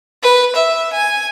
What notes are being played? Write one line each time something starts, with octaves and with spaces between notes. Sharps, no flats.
B4
E5
G#5